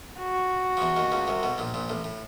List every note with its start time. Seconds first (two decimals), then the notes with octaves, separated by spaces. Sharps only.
0.19 F#4
0.77 F3
0.81 E2 E3
0.96 D#2 D#3
1.12 C#2 C#3
1.27 C2 C3
1.43 B1 B2
1.58 A#1 A#2
1.74 A#1 A#2
1.90 A1 A2
2.04 A2